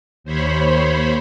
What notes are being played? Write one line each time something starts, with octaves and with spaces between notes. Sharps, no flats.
D#2 C5 C#5 B5